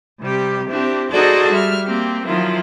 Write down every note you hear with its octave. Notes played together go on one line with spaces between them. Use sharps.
C3 G3 G4
C4 D4 E4 G4
D#4 F#4 G#4 A4 C5 D5
G3 E5 F6
A#3 C4 G4
D#3 F3 F#3 E4 F4